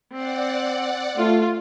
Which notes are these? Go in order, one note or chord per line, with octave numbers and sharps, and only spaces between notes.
C4 D5 F#5
A3 F4